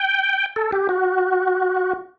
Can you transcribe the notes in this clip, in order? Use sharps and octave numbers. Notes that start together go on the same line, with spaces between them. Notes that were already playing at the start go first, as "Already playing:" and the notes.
Already playing: G5
A4
G4
F#4